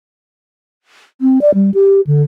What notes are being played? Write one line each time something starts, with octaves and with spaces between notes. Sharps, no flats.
C4
D5
G3
G4
D3